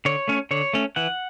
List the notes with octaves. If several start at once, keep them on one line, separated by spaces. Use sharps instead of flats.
D3 C#5
A3 C#4
D3 C#5
A3 C#4
E3 F#5